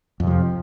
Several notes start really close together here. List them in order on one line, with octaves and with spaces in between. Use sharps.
F2 C3 F3